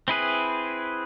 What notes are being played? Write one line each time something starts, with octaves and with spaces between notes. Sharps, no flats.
C4 E4 G#4 B4